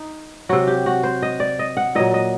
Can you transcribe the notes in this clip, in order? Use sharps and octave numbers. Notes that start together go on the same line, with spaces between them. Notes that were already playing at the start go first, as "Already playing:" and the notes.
Already playing: D#4
C3 F#3 F#4
G4
F#4
C5
D#5
D5
D#5
F#5
A#2 F#3 D#5
D#5